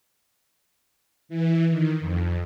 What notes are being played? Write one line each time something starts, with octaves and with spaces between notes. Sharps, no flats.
E3
D#3
F2